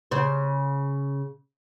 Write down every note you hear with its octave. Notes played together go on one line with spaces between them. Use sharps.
C#3 C5